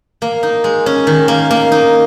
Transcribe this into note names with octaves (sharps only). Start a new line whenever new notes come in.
A#3
D#4
G#3
C#4
D#3
A#3
A#3
D#4